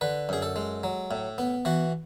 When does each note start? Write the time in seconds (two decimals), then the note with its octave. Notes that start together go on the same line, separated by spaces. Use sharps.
0.01 D3 B4
0.29 F#2 G#4
0.42 A4
0.56 G#3
0.83 F#3
1.11 A2
1.38 B3
1.65 E3 F#4